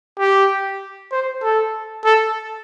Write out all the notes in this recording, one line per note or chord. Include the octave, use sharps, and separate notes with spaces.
G4
C5
A4
A4